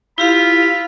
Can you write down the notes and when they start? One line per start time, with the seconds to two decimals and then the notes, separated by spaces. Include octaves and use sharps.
0.18 E4 F4 G4 F5 B5